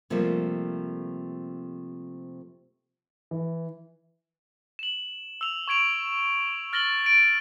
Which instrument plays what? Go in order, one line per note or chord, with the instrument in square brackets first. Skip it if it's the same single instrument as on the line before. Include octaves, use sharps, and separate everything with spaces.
[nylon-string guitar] C3 F3 G3 A3 A#3
[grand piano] E3
[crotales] E7 F#7
E6 F7
C#6 G#6 D7 F7
F6 A6 A#6 F#7 G7
A6 D7